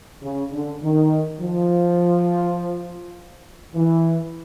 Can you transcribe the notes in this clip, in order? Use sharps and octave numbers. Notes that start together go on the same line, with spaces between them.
C#3
D3
D#3
F3
E3